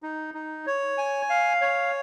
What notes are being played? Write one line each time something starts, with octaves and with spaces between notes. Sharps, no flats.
D#4
D#4
C#5
G#5
F5
C#5